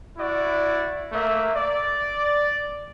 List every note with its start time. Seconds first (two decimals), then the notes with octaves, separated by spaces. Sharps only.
0.18 E4 F#4 D5
1.12 A3 A#3 E5
1.55 D5